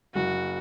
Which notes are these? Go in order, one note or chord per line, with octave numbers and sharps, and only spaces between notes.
F#1 F#4